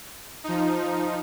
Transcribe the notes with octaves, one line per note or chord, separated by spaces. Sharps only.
F3 D#4